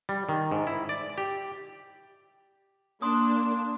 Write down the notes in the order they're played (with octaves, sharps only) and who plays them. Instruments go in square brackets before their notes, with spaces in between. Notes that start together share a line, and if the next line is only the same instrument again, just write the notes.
[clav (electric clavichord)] G3
D#3
G#2
E4
D5
G4
[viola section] A#3 D4 [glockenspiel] C6 D#6